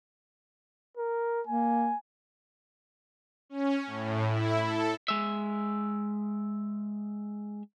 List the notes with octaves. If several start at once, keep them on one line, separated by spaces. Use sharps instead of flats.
A#4
A#3 G#5
C#4
A2
E4
A4
G#3 E5